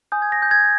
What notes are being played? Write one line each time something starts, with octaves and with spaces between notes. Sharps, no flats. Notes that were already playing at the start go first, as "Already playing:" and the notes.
G#5 D#6 G6
G#6
A#6
G6
G#6